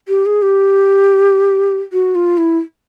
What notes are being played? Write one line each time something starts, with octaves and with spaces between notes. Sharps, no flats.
G4
G#4
G4
F#4
F4
E4